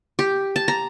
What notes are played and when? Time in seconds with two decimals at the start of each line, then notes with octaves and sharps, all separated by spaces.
0.19 G4
0.56 A5
0.68 A#5